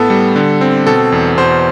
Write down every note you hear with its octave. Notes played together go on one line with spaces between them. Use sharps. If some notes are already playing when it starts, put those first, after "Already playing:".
Already playing: A2 B3 A4
G3
D3
C4
B2 A4
E2
B2 C5